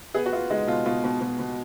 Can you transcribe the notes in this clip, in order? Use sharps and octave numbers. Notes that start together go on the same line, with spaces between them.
B3 G#4
F#4
B3 F4
G#3 D#4
B2 F4
B2 F4
B2
B2
B2